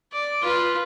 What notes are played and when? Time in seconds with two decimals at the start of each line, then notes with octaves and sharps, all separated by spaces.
0.12 D5
0.42 F4 B4